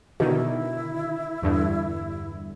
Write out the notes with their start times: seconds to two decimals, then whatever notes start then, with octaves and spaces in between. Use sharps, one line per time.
0.20 B2 D3 D#3 E4
1.42 E2 G2 D3